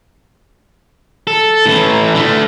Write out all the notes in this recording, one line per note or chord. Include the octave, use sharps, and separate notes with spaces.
A4
A2 E3
D3 A3